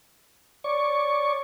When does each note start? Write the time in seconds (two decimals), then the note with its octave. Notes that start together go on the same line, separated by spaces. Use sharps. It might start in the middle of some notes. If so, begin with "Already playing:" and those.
0.64 C#5 D5 C#6